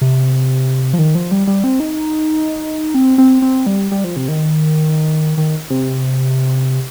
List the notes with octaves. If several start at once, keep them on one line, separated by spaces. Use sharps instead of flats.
C3
F3
D#3
F3
G3
G3
C4
D#4
C4
C4
C4
G3
G3
F3
C3
D#3
D#3
C3